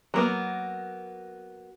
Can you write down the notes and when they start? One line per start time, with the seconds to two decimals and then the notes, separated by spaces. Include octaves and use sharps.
0.14 F#3 A#3 B3